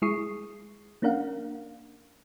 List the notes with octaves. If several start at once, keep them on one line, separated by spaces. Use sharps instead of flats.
G#3 E4 G#4 C#6 D#6 C7
A#3 C#4 D4 A#4 F5 F#5